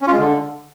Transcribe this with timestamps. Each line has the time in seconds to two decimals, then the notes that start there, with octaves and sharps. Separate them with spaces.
0.01 C#4
0.07 F4
0.13 G#3
0.19 D3